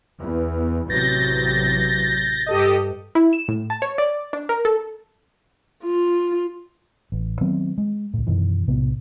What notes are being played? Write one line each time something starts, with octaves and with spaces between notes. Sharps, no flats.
E2
A1 C3 F#3 G6 A6 A#6
G2 G4 A4 D#5
E4
E7
A2
A5
C#5
D5
D4
A#4
A4
F4
A1
D#3 F#3 B3 C4
G#3
C#2 A2
F#2 B2 D#3 E3
B1 A2 C3 B3